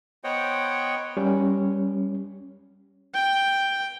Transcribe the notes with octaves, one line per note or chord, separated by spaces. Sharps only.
B3 C5 C#5 D#5 F#5 G5
G3 C#4
G5